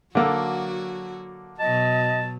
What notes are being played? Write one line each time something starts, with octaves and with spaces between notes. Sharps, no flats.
D3 F#3 A#3 F#4 A4
B2 F#3 D#5 A5